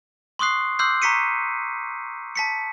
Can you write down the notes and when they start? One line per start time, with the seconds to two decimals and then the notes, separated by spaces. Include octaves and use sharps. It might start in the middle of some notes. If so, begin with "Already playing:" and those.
0.39 C6 C#6 D#6 F#6 C7
0.79 C6 D6 E6 F#6 G6 C7
1.02 A#5 C#6 B6 C#7 D#7
2.36 A5 B6 C#7